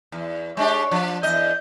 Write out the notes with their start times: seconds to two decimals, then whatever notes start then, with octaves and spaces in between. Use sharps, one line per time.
0.12 E2
0.57 G#3 D4 G4 C#5
0.91 F3 D4
1.23 E2 D#5 G6